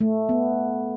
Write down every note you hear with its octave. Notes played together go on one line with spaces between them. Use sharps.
A3
B3